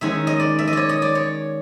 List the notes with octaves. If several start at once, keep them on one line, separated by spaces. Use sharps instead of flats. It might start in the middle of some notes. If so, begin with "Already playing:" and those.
D#3 G#3 C#4 E5
D#5
D5
E5
D#5
C#5 D5
D#5
D5
C#5